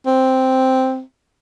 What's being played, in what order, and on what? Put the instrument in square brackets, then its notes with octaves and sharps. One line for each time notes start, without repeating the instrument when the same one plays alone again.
[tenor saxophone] C4